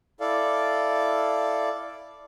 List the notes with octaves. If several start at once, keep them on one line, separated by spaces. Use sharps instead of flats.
E4 A4 D5 F5